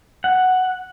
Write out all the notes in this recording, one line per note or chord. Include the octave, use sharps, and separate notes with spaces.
F#5